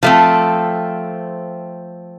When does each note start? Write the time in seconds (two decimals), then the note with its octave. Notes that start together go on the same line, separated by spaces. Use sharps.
0.03 F3 A3 C4